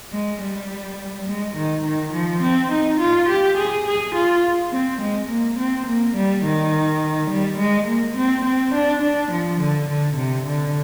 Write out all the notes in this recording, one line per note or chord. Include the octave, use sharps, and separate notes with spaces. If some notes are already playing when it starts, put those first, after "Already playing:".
G#3
G3
G#3
D#3
D#3
F3
C4
D#4
F4
G4
G#4
G#4
F4
C4
G#3
A#3
C4
A#3
G3
D#3
G3
G#3
A#3
C4
C4
D4
D4
F3
D3
D3
C3
D3